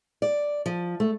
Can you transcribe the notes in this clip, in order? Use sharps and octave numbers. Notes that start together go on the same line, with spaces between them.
D5
F3
A3